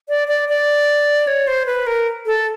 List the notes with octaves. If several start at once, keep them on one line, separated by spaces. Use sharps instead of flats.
D5
D5
D5
C#5
C5
B4
A#4
A4